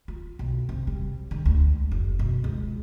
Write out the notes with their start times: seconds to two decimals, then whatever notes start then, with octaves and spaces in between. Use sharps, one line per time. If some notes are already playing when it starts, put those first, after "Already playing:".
0.08 F4
0.39 B1
0.69 C3
0.87 G3
1.31 D3
1.46 D2
1.67 G#3
1.92 F#1
2.19 B2
2.44 C#2